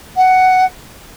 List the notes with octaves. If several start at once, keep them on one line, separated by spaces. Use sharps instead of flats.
F#5